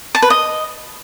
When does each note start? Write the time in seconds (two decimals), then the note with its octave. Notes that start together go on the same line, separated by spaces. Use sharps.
0.15 A5
0.22 B4
0.30 D#5